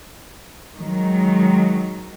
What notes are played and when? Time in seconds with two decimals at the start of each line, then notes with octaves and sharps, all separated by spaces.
0.76 D#3 F#3 G#3